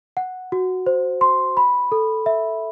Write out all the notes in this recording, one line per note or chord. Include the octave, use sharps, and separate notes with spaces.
F#5
F#4
C5
C6
B5
A4
E5